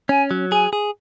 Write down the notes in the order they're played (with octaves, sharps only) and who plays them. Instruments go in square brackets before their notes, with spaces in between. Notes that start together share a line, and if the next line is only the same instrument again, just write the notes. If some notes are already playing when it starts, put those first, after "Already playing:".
[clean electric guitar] C#4 [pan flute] G#5
[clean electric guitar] F#3
[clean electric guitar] G#4 [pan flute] G#5
[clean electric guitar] G#4